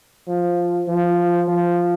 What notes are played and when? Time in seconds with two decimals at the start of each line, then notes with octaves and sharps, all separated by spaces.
0.28 F3
0.88 F3
1.48 F3